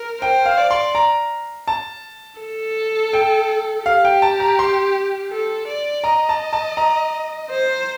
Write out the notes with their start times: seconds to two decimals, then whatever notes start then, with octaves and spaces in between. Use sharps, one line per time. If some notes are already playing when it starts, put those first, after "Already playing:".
Already playing: A#4
0.22 C5 G5
0.46 F5
0.58 D5
0.71 C6
0.95 A#5
1.68 A5
2.40 A4
3.13 G5
3.86 G4 F5
4.05 G5
4.22 A5
4.40 A#5
4.59 C6
5.32 A4
5.68 D5
6.04 D#5 A#5
6.29 A5
6.53 A5
6.77 A#5
7.50 C5